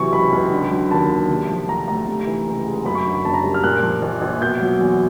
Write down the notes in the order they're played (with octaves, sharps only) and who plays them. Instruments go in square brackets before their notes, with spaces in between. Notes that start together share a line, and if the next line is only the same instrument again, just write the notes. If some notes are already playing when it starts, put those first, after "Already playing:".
Already playing: [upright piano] C3 E3 F#3 C#6
C#2 B5
C#2
D3
F#3
D#2 A5
D#2
C3
F3
D2 A#5
A3 A#5
C3
E3
C#2
G#3
F#2 B5
C#6
D3
B5
F#1 A5
A#5
G3
F6
A#2 F#6
F3
A#1
A#1
B2 G6
F#3
E2